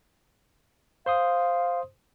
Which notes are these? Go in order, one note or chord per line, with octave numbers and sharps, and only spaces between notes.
C5 F5 C6 D#6